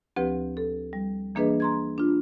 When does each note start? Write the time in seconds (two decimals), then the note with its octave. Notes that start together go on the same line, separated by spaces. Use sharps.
0.16 D2 F3 C4 G4 B4
0.57 A4
0.93 G3
1.35 E3 A#3 D4 G#4 B4 D#5
1.60 A#5 C6 G#6
1.98 D4 F4